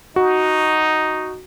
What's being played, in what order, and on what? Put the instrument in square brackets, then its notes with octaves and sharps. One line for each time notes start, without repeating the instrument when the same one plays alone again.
[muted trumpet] D#4 [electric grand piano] F#4